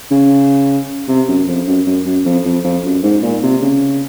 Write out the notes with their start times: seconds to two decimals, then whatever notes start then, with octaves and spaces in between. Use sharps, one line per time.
0.11 C#3
1.08 C3
1.28 F#2
1.47 F2
1.67 F#2
1.86 F#2
2.05 F#2
2.25 F2
2.45 F2
2.64 F2
2.84 F#2
3.03 G#2
3.22 A#2
3.43 C3
3.62 C#3